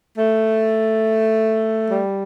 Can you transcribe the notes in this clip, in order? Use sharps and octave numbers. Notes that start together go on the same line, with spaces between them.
A3
G3